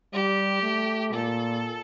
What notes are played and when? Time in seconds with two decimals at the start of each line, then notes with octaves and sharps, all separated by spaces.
0.14 G3 G4
0.63 A3
1.13 A#2 A4